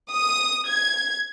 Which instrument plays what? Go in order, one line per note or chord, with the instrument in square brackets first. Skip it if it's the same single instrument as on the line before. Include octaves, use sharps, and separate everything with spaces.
[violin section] D#6
G#6